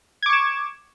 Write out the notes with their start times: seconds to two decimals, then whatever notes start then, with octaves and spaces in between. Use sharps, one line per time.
0.22 G#6
0.26 D6
0.29 C#6
0.33 E7